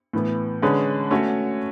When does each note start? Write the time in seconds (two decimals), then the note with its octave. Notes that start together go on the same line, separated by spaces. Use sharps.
0.13 A2 E3 B3
0.62 D3 G#3 C#4 G#4 B4
1.11 A3 C#4 F#4 C#5